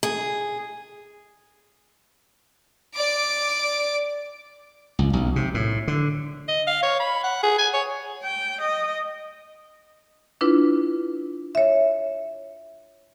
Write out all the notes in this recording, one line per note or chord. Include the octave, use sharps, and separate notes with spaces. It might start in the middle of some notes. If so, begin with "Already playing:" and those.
G#4
D5 D6
C#2
B1
C3
A2
D3
D#5
F5
C#5
B5
F#5
G#4
G#5
C#5
G5
D#5
D4 E4 F4 B4
C#5 E5